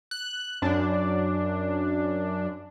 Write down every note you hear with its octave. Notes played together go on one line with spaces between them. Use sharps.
F#6
F#2 D4